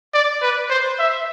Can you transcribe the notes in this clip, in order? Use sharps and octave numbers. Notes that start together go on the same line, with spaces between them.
D5
B4
C5
E5